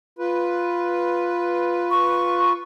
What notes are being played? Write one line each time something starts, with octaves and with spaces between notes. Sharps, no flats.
F4 B4
C#6